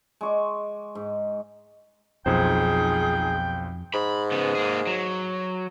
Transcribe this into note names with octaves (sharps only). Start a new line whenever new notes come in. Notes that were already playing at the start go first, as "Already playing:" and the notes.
G#3 C#6 D6
G#2
B1 F2 D#4 F4 G#4 C5 G5
G#2 B5
C#3 B3
A#3 G#4
F#3